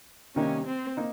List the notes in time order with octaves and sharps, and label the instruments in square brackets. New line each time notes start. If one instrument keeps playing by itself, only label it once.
[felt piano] C3 D#3 G3 A#3 D#4 [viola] C#4
[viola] C4
[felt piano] A#3 D#4